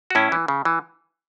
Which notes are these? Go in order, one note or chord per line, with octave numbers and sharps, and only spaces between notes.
F#4
A2 C#4 E4
E3
C#3
E3